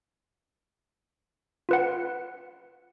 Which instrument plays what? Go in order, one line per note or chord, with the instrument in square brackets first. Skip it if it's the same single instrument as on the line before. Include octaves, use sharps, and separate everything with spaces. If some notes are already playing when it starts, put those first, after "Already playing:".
[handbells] F4 B4 F#5